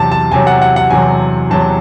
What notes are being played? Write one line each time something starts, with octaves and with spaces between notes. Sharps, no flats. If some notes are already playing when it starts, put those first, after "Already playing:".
Already playing: E2 C3 F#3 A5
A5
E2 C3 F#3 G#5
F#5
F#5
F#5
E2 C3 F#3 G#5
E2 C3 F#3 A5